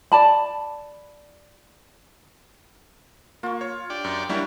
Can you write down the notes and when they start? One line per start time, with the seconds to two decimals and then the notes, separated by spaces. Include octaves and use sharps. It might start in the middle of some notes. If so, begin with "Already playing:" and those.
0.12 D5 A5 B5
3.43 A#3 F4 C#6
3.61 C#5
3.90 D4 G4 D5
4.04 F#2
4.29 F#3 G3 A#3 C#4 D4 E4 C#5 G5